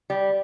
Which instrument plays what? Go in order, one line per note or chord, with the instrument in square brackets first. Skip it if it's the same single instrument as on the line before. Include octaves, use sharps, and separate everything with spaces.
[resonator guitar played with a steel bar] G3